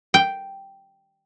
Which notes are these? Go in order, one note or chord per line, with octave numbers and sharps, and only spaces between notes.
G5